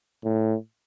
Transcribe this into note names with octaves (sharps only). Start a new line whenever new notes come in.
A2